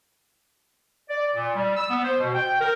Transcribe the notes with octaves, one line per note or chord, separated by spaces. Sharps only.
D5
A#2
G3
E6
B3
C5
B2
G5
A#4